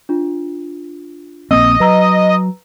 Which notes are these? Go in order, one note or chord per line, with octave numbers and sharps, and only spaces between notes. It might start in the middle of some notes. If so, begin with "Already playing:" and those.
D4 F4
A#1 A#3 C4 D#5 D#6 E6
F#3 B4 A#5 E6